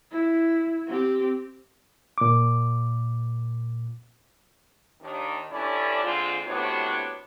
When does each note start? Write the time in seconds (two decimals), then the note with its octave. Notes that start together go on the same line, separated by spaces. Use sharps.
0.11 E4
0.87 C4 G4
2.18 A#2 D6
5.01 D#2 D#3 D4
5.51 G2 C#4 D4 E4 A4 D5
6.04 D3 G#3 C4 F4
6.47 A2 C3 B3 D4 F#4 C#5